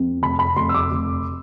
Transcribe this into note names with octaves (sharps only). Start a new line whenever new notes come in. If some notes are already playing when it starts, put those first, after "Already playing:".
Already playing: F2
F1 B5
B5
F1 C6
E6
D6
F1